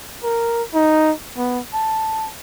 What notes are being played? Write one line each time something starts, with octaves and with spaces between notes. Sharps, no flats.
A#4
D#4
B3
A5